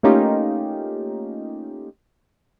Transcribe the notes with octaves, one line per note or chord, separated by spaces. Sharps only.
A3 A#3 C#4 D#4 F4 G4